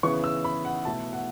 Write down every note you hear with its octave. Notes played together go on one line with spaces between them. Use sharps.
C#3 E3 B3 C#6
E6
B5
F#5
B2 A3 E4 A5
F#5